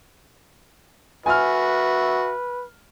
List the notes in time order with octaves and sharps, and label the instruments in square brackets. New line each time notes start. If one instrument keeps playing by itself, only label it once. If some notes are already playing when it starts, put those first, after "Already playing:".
[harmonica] F#4 E5 [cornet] B4 [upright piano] G#5 F6